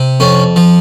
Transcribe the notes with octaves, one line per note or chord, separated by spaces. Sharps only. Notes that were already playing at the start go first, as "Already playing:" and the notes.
Already playing: C3
F2 C#4
F3